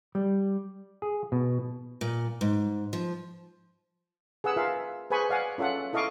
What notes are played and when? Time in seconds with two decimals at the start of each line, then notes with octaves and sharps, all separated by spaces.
0.15 G3
1.02 G#4
1.32 B2
2.01 A#2
2.41 G#2
2.93 F3
4.44 G#4 B4 F#5 E6
4.56 F4 A#4 E5 F5
5.10 G#4 B4 C5 G#5 B5 C#6
5.29 D5 F5 F#5 G#5
5.58 C#4 F4 A4 E5 F#5
5.93 E4 A4 D#5 F5 C#6 D6